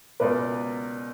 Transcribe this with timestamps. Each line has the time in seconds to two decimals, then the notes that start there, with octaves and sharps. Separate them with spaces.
0.20 C#2 B2 A#3 B4 D5